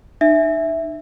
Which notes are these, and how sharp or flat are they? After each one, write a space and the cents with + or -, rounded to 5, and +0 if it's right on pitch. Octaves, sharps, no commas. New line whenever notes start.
D#4 -45 E5 +0